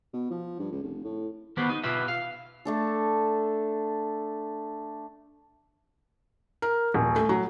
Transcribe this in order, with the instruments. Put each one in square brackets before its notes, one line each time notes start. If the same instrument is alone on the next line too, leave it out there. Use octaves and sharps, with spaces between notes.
[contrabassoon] B2
F3
G2
C#2
F1
A2
[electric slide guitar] D#3 B3 G4 B4 C5
D#4
B2 F4 G4 B4 E5
F5
[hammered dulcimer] A3 D4 A4
[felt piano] A#4
D#1
A3
F#3